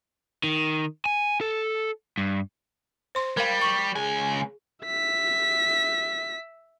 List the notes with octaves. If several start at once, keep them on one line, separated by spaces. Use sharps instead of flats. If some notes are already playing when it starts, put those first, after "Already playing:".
D#3
G#5
A4
G2
C5 C6
G3 A#4 F5
C#6
C#2 G#4 G#5
E5 B6